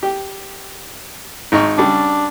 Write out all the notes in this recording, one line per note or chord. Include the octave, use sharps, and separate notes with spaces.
G4
G#1 D#4 C#6
C#3 G3 D4